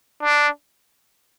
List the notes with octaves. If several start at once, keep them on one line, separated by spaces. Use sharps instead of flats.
D4